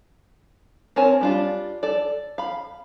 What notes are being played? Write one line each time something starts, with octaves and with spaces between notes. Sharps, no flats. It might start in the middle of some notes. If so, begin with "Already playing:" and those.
C4 A#4 C#5 G#5 A5
G3 D4 F4
A4 D5
F5 B5